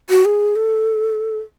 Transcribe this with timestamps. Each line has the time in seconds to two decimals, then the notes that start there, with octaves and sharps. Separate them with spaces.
0.10 F#4
0.25 G#4
0.56 A4